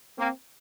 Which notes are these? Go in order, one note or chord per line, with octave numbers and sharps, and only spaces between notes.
A#3 C4